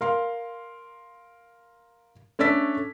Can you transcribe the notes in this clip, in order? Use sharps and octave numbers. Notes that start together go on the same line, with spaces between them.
A#4 F5 C6
A3 C#4 D4 D5 E6 B6